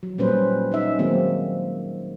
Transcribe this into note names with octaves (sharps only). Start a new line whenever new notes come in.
F#3
A#2 G3 C#4 B4 C5
C#4 D#4 E5
D#3 F#3 G#3 A#3 C4